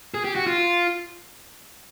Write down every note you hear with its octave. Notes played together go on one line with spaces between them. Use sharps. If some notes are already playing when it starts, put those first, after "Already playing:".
G#4
G4
F#4
F4